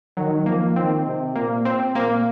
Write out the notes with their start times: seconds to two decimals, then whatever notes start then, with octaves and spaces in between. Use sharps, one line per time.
0.17 D#3 F#3
0.46 F3 A#3
0.76 D#3 C4
1.06 C3
1.35 A#2 A#3
1.65 C4
1.95 A#2 A#3